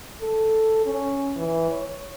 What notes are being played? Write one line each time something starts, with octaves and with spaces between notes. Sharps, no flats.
A4
C#4
E3
C#5